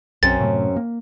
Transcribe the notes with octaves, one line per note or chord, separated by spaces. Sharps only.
B1 F#2 C4 C#4 A6
A2 C3 A3
A#3